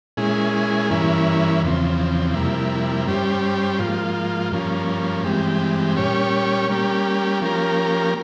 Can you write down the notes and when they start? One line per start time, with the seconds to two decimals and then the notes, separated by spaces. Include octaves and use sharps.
0.17 A#2 G#3 C#4 E4 G#4
0.90 G2 E3 A#3 C#4 E4
1.62 E2 C#3 F3 C4
2.34 F2 C3 G3 A#3 E4
3.07 G2 G3 C#4 G4 C5
3.79 G#2 F3 A#3 F4
4.52 G2 F3 A#3 C#4
5.24 G2 E3 G#3 C4 G4
5.96 A#2 G3 C#4 G4 C#5
6.69 G3 A#3 C#4 G4
7.42 F3 A#3 C#4 G4 A#4